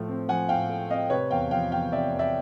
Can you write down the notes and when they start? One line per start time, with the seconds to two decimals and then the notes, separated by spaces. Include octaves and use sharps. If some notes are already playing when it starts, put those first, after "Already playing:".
Already playing: A2 F3 A3
0.09 C4
0.28 F3 F#5 G#5
0.49 A2 F5 G5
0.69 A3
0.90 C4 D#5 F5
1.10 C3 B4 C#5
1.30 E2 F5 G5
1.51 F3 F5 G5
1.71 E2 F5 G5
1.92 C3 D5 E5
2.12 E2
2.19 D5 E5